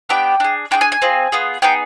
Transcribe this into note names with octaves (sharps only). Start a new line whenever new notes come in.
B3 D4 G4 G5
D4 G#4
D4 F4 G#4 G5
G#5
G#5
C4 F4 G#4
B3 F4 G#4
B3 D#4 G#4 G5